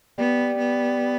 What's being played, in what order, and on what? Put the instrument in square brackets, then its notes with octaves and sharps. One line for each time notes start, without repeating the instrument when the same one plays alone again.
[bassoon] G3 [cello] B3
[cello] B3